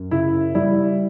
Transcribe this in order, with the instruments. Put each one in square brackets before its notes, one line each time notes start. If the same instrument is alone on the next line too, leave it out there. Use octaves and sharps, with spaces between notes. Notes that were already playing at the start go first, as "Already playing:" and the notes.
Already playing: [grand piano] F#2
C#3 E4
G3 E4